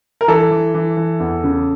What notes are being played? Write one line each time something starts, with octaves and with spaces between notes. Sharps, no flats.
A#4
E3 A4
E3
E3
E3
E2
C#3